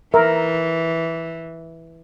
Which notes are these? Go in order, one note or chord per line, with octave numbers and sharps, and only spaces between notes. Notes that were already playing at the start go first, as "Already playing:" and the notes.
E3 A#4 E5